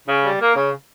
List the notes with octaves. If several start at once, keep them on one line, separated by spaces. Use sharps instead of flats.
C#3
G3
A#3
C#3